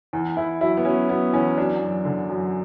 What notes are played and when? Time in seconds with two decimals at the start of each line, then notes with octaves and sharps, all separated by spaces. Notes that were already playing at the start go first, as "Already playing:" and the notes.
0.13 E2
0.37 E2 E4
0.61 F#3 E4
0.77 B3
0.85 F#3 C#4
1.09 F#3 B3
1.33 E2 C#4
1.57 F#3 D4
1.81 F#2
2.05 D3
2.29 F#2